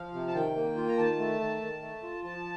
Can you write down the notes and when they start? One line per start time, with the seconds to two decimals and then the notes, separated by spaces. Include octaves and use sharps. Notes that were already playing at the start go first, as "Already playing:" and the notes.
Already playing: F3 F5
0.13 C3
0.28 A5
0.35 D#3 G5
0.56 A#3
0.77 F4
0.89 A#5
0.98 D#3 A5
1.19 A3
1.40 D#3
1.61 D#3
1.82 A3
2.03 F4
2.24 F3 A5